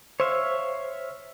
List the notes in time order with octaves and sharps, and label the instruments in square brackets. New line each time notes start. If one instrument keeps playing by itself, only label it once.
[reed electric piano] C5 [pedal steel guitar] C#5 E5 F5